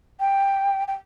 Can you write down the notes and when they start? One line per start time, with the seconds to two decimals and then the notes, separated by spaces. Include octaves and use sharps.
0.19 G5
0.87 G5